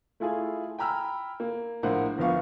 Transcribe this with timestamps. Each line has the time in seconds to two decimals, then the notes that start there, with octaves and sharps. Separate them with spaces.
0.20 A3 E4 F4 G#4
0.79 G5 G#5 A#5 B5 E6 F6
1.40 A#3
1.83 A#1 A2 A#3 C5 F#5
2.18 G1 F3 B3 F5 C#6